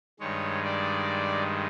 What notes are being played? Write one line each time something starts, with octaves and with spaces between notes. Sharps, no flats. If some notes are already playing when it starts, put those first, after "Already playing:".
G2 D#3 G#3 C#5
D5